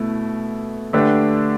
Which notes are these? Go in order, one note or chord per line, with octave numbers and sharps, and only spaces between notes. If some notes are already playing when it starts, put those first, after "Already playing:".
Already playing: B2 A3 E4
D3 A3 D4 G4 B4